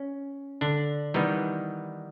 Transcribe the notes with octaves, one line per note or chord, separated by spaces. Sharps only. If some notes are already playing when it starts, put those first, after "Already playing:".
Already playing: C#4
D3 D4
D#3 E3 G3 B3 D#4